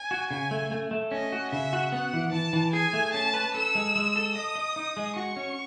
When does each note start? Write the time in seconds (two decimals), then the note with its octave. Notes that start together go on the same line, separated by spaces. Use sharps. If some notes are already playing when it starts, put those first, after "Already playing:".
Already playing: G#5
0.11 F#4
0.31 C#3 G#5
0.51 A3
0.71 A3
0.91 A3
1.11 C#4 D#5
1.32 F#4
1.52 C#3 E5
1.73 F#4
1.92 B3 F#5
2.13 E3
2.32 E3 A5
2.53 E3
2.73 G#4 G#5
2.93 A3
3.13 C#4 A5
3.34 B4
3.55 A4 E6
3.75 G#3
3.96 G#3
4.16 A4
4.35 D#5 D#6
4.56 D#5
4.76 D#4
4.97 G#3
5.16 F#4 C#6
5.36 C#4